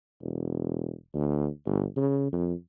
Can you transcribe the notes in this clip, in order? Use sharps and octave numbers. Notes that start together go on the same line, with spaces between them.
E1
D2
G1
C#3
F2